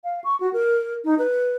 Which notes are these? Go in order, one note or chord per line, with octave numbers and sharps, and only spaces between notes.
F5
C#6
F#4
A#4
D#4
B4